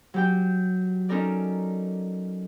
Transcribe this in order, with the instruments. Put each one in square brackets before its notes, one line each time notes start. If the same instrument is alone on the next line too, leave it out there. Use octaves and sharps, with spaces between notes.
[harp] F#3 G4 G5
C#4 D#4 A4 A#4 D5